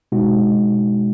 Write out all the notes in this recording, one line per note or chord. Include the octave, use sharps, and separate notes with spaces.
B2 G#3 D#4 F#4